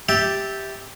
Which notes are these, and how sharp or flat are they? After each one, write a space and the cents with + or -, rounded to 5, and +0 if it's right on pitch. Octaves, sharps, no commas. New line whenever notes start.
G4 +0 E5 -10 A5 +0